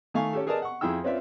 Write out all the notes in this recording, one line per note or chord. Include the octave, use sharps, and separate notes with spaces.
D#3 A3 F5 G#5 C#6
C#4 G4 A4
G#4 A#4 B4 D5 D#5 A5
F#5 C#6
F2 E4 G#4 G5 E6
C4 C#4 F4 B4 D5 E5